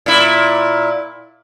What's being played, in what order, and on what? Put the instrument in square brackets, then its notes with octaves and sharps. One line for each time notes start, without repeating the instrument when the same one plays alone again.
[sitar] A#2 E4